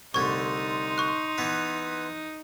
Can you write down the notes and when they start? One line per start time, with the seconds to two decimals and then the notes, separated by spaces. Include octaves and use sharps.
0.14 C2 D3 A3 D#4 C6 C#6 G#6
0.98 C#6 F#6
1.38 E3 B3 B4